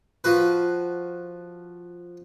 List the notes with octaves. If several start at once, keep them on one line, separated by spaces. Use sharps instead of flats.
F3 F#4 B4